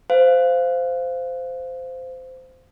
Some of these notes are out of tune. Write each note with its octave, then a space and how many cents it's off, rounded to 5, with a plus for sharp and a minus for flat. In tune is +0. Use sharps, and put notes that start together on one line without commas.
C5 -15 F5 +0